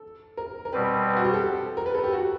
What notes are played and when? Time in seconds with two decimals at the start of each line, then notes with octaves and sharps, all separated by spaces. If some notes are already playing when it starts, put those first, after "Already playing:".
Already playing: A4
0.37 A#4
0.65 A#4
0.73 B2 G3 C4 B4
1.07 B4
1.17 F#4
1.24 G4
1.34 A4
1.77 A#4
1.86 B4
1.95 A4
2.03 G4
2.13 F#4